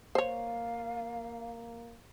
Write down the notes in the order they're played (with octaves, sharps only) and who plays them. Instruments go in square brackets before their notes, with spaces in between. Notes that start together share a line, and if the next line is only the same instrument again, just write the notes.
[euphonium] A#3 [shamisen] C5 C#5 [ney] F5